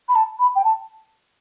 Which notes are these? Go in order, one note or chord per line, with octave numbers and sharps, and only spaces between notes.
B5
A5
B5
G5
A5